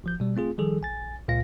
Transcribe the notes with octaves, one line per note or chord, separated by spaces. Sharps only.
G#1 F3 G6
B2 G3
A3 C4 F4 G#4
D#3 F3 G3 G#4 A4
A#1 G#5 A6
C#2 A#2 F4 F5 A#6